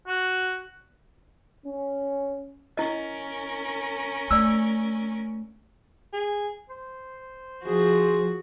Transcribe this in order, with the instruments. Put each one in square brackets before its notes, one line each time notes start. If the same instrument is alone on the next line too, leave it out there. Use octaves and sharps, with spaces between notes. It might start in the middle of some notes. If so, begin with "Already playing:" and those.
[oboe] F#4
[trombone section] C#4
[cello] C#4 A#4 [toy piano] E4 D#5
[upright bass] A3 [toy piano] D5 E6
[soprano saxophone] G#4
C5
[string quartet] F3 F#4 [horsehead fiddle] G#4